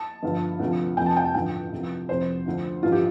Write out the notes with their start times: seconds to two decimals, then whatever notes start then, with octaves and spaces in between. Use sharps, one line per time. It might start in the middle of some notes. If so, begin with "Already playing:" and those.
Already playing: A5
0.22 G1 G2 D3 F3
0.59 D2 C3 F3
0.97 F1 F2 C3 F3 G5
1.06 A5
1.16 G5
1.25 A5
1.34 A1 G2 D3 F3 G5
1.72 C2 C3 F3
2.09 F1 F2 C3 C5
2.46 D2 D3 F3
2.83 A1 G2 D3 F3 F4
2.92 G4